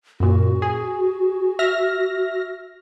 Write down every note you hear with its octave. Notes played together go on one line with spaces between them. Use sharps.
F#2 A#2 F#4
G#4
E5 F6 A#6